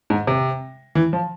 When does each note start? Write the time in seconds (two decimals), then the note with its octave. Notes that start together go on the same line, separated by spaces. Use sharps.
0.10 G#2
0.27 C3
0.95 E3
1.13 F3